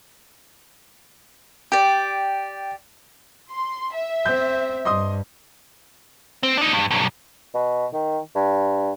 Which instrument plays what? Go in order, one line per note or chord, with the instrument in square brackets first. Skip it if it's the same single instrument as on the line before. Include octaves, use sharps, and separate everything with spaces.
[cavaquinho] G4 D5 [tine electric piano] G5
[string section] C6
E5
[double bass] C4 [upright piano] G6
[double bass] G2 [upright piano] D#5 C6 D#6
[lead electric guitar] C4
D4 D#4
G2
B1 G2
[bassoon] B2
D#3
G2